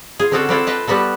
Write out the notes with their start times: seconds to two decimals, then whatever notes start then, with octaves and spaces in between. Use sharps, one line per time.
0.19 F4 G#4
0.31 D3 C4 C#4 F#4 G#4 A4
0.49 C4 D4 E4 F4 A4 F#5
0.67 B4 D#5 F5 G5 A5
0.87 G3 B3 F#4 A4